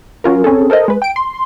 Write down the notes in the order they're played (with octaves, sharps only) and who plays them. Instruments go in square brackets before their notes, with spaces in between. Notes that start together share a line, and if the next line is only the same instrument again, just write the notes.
[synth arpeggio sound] F#3 C#4 F4 A#4
C4 C#4 G#4 A4
A4 A#4 C5 D#5
G#3 B4
G5 D7
C6